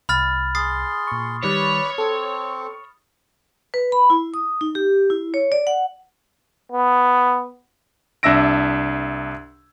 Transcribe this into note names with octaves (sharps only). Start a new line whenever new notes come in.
C2 B5 F6 A6
G#4 C6 D#6 A6 C7
A#2 C#6
D#3 G3 B4 C#5 D5 B5
C4 A4
B4
B5
E4
D#6
D#4
G4
E4
C#5
D5
F#5
B3
C2 D4 E5 E6 A#6 D7